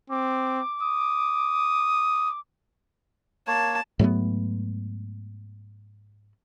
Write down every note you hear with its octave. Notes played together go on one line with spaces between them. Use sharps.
C4 D6
D#6
A#3 C#5 A5
G#2 F#3 A3 B3